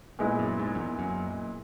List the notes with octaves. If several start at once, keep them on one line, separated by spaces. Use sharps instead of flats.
A#2 G#3 B3 E4
F#2
G#2
F#2
E2
F#2